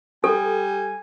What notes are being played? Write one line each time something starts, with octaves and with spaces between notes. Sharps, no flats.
G3 A4 G#5